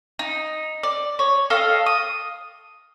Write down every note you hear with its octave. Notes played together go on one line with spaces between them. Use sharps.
D#4
D5
C#5
A4 D#5 F5
D#6